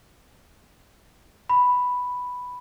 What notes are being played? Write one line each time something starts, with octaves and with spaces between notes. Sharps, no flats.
B5